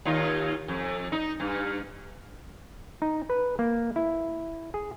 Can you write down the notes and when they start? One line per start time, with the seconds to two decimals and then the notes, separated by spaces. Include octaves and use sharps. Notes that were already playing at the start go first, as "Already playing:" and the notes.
0.05 D#2 D#4 F4
0.68 F2
1.12 D#4
1.40 G2
3.02 D#4
3.30 B4
3.59 A#3
3.96 E4
4.74 G#4